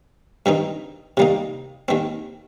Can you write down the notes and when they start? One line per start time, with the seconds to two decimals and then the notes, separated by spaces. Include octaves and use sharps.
0.46 G2 D#3 C4 D#4
1.17 C3 G3 A#3 D#4
1.88 D#2 D#3 C4